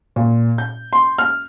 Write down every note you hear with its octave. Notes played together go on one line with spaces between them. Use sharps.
A#2
G6
C6
F6